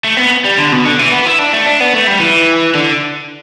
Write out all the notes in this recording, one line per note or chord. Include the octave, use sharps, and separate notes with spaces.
A3
B3
G3
D3
B2
D3
E3
B3
E4
D4
A3
D4
B3
A3
G3
E3
D3